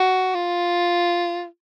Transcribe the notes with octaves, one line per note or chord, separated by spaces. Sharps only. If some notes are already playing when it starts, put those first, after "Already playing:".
Already playing: F#4
F4